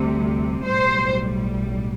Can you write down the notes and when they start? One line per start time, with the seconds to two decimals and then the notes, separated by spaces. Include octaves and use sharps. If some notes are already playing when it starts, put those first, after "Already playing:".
Already playing: D2 C3 G3
0.66 B1 A2 G3 C5